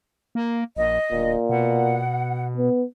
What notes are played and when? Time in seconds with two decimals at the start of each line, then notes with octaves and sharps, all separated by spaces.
0.35 A#3
0.76 A#1 D#5
1.12 D1 A#2
1.49 B2 F#5
2.57 B3